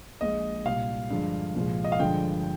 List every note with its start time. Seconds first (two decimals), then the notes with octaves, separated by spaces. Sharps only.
0.21 A#1 A#2 G#3 D#5
0.66 C2 A#2 G3 F5
1.10 G2 D3 F3 G#3
1.55 C2 A#2 F3 G#3
1.84 D#5
1.92 F5
1.99 G1 G2 D3 F3 G#3 G5